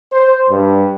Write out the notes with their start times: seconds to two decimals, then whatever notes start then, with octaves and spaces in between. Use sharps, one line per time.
0.13 C5
0.49 G2